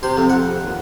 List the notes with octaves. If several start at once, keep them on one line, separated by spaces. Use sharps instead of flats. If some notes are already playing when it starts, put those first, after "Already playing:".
C3 C5
F2
F2 F#5
D#2